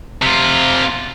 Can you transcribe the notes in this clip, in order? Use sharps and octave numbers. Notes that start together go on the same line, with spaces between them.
C3 F4